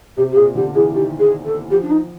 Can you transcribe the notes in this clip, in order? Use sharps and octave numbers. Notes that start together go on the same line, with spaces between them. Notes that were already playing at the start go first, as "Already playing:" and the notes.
C3 G4
G4
A#2 G#4
D3 G4
E3 G#4
D#3 G4
G#4
A4
F3 G4
D4
D#4